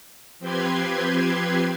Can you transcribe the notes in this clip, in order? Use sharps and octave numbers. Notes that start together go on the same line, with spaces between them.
F3 C4 G4 B4 C6 G#6